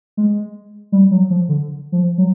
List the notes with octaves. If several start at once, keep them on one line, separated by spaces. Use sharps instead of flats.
G#3
G3
F#3
F3
D3
F3
F#3